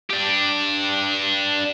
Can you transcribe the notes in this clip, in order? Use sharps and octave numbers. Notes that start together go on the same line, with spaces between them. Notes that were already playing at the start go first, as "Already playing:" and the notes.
D4 G4